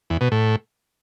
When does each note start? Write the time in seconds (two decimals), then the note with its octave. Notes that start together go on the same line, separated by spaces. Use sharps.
0.10 E2
0.21 B2
0.32 A2